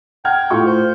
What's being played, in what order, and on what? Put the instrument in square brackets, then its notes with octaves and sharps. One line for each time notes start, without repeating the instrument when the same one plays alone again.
[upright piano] F#5 F6 G#6 [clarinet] G5
[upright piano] A2 F4 C#6
[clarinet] C5